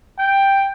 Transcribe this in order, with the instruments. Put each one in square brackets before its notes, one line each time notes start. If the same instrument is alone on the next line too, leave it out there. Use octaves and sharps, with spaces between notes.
[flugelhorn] G5